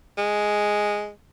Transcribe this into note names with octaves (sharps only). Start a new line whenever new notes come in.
G#3